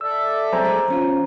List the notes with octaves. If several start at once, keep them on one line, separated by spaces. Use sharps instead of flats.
A4 D5 E5 E6
F#3 G#3 C4 C5 G#5 A#5
G#3 A3 G#4
E2 C#4 F4